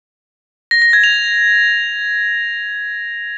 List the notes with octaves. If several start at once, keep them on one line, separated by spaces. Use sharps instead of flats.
A#6
A#6
G#6
F7